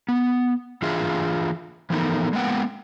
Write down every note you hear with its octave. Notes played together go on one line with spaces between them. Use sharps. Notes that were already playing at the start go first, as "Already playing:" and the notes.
B3
E3 D4 F4 G#4 E5 F5
E3 F3 A3 B3 D#4 A#4
G#3 A#3 B3 F#5 G5